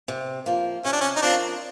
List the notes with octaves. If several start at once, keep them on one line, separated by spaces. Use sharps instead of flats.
C3
F3 A#3
C3 C#4
D4
C#4
D#4
F3 A#3 C4 D4